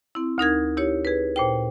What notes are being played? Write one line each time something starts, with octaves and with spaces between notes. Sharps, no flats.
C4 E4
D2 D#4 A#4 G#6
E4 G4 C#5
G#4 B4
A#2 C5 G5